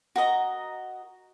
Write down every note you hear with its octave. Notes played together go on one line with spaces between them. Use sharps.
F#4 A#4 D#5 A#5